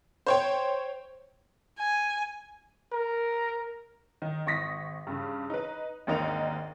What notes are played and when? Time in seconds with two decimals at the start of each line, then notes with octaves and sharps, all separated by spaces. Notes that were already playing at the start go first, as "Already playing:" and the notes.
0.27 C5 C#5 G5
1.79 G#5
2.92 A#4
4.22 D#3
4.46 G#1 C#6 D#6 A#6 B6
5.07 G2 C#3
5.50 D#4 B4
6.07 G#1 D#2 D4 D#4 A#4 F7